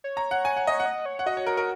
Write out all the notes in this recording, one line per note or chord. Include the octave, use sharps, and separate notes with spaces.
C#5
A#5
F#5
G#5
F#5
D#5
F#5
D#5
C#5
F#5
F#4 D#5
C#5
A#4
A#4